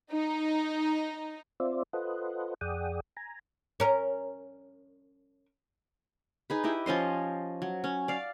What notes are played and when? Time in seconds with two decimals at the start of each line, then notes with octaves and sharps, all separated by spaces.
0.12 D#4
1.60 C4 F4 C5 D5 E5
1.93 F4 A4 B4 C5 D#5 F#5
2.61 F2 G#4 D5 F#5 G5 D#6
3.17 G#5 A#5
3.80 C#4 A#4
6.50 D#4 G#4 B4
6.64 E4 G4 D#5
6.86 F3 C#4 D#5 C6
7.62 F#3
7.84 C#4
8.08 D5 F5